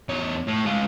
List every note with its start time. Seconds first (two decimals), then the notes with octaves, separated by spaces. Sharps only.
0.09 E2 C#5
0.47 A2
0.65 G#3 F4